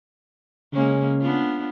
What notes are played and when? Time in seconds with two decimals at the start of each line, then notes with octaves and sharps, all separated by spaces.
0.73 C#3 G#3 A#3 C#4
1.21 B3 D4 F4